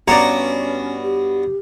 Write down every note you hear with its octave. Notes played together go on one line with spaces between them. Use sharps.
G2 B3 C#4 F#4 C#5 D5 A#5
G4